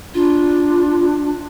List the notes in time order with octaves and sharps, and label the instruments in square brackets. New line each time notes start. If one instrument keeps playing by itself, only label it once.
[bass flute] D4 [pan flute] F4